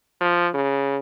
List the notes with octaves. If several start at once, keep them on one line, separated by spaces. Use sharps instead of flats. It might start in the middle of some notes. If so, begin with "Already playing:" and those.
F3
C#3